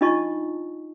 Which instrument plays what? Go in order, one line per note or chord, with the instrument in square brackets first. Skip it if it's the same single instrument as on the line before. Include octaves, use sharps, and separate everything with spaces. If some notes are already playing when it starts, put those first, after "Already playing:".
[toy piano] D4 D#4 F4 D#5 A5 C#6